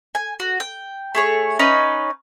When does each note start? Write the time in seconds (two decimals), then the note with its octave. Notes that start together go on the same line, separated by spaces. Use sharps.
0.15 G#5
0.40 F#4
0.60 G5
1.15 A3 G#4 C#5
1.59 C#4 D#4 B4 D#5